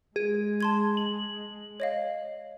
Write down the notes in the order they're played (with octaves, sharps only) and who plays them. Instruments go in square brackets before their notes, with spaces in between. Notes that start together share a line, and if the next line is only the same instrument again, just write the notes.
[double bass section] G#3 [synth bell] G#4
[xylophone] A5 C6 G#6
[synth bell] F#7
[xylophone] C#5 D#5 F5